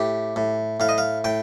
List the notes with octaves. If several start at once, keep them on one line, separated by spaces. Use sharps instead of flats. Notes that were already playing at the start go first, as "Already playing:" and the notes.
Already playing: A2 G4
A2
A2 F5
D#5
F5
A2 G5